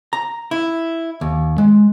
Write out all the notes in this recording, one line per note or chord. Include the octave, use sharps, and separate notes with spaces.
A#5
E4
D#2
G#3